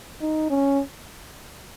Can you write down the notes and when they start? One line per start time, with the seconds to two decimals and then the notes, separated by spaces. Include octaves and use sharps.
0.21 D#4
0.50 C#4